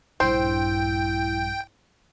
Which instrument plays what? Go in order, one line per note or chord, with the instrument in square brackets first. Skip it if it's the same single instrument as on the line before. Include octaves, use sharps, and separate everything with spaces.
[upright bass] A#1 G2 [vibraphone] E4 [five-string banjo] C5 [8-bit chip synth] G5